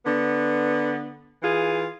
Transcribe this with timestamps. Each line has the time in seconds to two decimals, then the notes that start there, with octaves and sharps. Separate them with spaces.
0.05 D3 B3
1.43 E3 F4 G#4